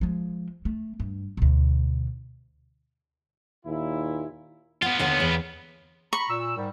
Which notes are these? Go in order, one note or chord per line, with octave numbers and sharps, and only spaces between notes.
F3 G#3
A3
G2
D2 B2
D#2 A#2 E4
B3 F4 F#5
D#2 D3 F#5
E2
A#5 B5 C#6
A#2 E6
G#2 D#3 G3